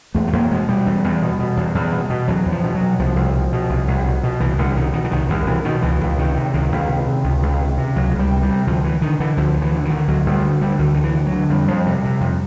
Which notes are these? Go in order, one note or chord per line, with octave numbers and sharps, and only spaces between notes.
E2 A3
A3
E2 A#3
B2 G#3
B2 G3
E2
E2
B2
B2
E2
E2
B2
B2
E2 F#3
E2
F3
B2
F#3
B2
C2 F3
C2
B2
B2
C2
C2
B2
B2
C2 E3
C2 D3
B2 D#3
B2 D#3
E3
C2 D#3
C2 D#3
B2 E3
B2 D#3
C#2 E3
C#2
C3 D#3
C3
C#2 D#3
C#2
C3
C3
C#2
C#2
C3
C3
C#2 F#3
C#2
G3
C3
G3
C3
D2 F3
D2 E3
D3 D#3
D3 E3
D2 F3
D2
E3
D3
D3 D#3
D2 F#3
D2 G3
D3
D3 G3
D2 D#3
D2 D#3
E3
D3
F#3
D3
F2 G3
F2
C3
C3
F2